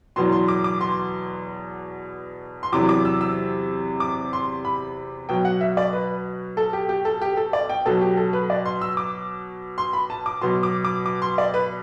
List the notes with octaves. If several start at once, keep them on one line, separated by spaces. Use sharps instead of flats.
E2 B2 F#3 C6
C6
D6
D6
C6
C6
E2 C3 F#3 D6
D6
E6
E6
D6
C6
B5
B2 F#3 G5
F#5
E5
D5
B4
A4
G4
G4
A4
G4
A4
D5
G5
B2 F#3 A4
G4
A4
B4
D5
C6
E6
D6
C6
B5
A5
D6
B2 F#3 C6
D6
D6
D6
C6
D5
B4